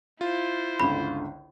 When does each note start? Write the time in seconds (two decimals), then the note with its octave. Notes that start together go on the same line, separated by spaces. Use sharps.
0.21 E4 F4 C5
0.80 G1 C#2 D3 B5